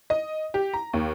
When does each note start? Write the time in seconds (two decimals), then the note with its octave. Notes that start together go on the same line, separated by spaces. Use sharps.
0.10 D#5
0.54 G4
0.73 A#5
0.93 D#2